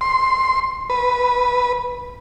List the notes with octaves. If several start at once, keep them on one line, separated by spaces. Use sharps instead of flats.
C6
B4